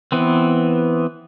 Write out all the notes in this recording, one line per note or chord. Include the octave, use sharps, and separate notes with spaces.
E3 B3 C4